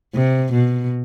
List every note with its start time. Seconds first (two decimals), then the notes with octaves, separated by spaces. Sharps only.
0.14 C3
0.53 B2